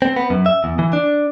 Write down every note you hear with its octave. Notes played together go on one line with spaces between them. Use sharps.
C4
B3
F#2
E5
E2
E3
D4